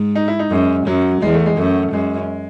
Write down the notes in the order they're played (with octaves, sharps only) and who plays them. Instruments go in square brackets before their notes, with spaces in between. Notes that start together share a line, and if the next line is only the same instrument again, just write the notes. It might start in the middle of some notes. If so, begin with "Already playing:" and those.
Already playing: [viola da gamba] G#2
[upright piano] D#4
E4
D#4
[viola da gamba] F#2 [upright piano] G#3
[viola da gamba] F#2 [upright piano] F#3
[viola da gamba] E2 [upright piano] G#3
[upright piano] A3
G#3
[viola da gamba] F#2 [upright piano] A3
[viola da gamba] F#2 [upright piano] G#3